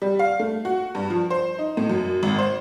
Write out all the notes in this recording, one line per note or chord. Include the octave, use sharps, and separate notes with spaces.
G3
F5
A3
F#4
G2
F3
C5
D#4
A2
F#2
G#1
C5